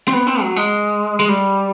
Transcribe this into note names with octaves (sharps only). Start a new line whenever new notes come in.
C4
B3
C4
F#3
G#3
G#3
G3